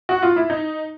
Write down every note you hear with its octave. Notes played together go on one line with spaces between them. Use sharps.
F#4
F4
E4
D#4